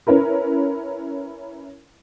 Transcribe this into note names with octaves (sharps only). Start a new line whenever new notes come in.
C#4 E4 A#4 B4